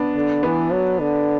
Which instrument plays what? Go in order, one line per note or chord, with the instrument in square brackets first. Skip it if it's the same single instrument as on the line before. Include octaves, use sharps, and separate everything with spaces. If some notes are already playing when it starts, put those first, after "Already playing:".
Already playing: [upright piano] B3 D4
[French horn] D3
[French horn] E3 [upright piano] B3
[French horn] F#3
D3